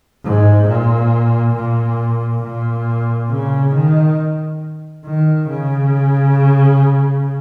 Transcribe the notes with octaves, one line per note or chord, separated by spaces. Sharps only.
G#2
A#2
A#2
A#2
C#3
D#3
D#3
C#3